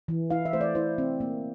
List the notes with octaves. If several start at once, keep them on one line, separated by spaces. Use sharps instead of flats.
E3
E4 F5
E5
A3 C5
D5
E4 C5
C4
A#3